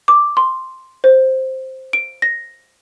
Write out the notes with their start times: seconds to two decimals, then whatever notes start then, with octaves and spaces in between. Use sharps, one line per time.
0.08 D6
0.37 C6
1.04 C5
1.93 D7
2.22 A#6